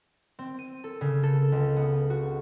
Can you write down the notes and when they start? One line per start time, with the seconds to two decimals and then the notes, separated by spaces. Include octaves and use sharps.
0.39 C4
0.59 D#7
0.84 A4
1.01 C#3
1.23 A4
1.52 C#2
1.77 B3
2.10 F#4